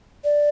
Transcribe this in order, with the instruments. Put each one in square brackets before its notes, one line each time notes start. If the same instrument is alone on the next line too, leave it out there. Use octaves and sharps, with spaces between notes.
[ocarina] D5